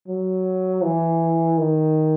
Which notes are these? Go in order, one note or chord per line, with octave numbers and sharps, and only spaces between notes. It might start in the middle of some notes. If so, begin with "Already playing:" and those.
F#3
E3
D#3